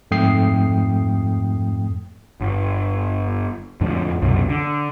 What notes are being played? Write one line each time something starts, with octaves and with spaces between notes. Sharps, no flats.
F2 G#2 A3 G5 D#6 C7
G1
F2 A2 D3
C2 F#2 B2
D3